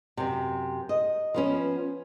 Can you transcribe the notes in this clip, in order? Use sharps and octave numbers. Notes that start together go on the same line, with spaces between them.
F#2 C3
D#5
F3 B3 C#4